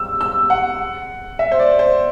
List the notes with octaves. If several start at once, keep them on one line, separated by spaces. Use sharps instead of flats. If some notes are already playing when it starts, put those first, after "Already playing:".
Already playing: E6
E6
F#5
E5
C5
D5
C5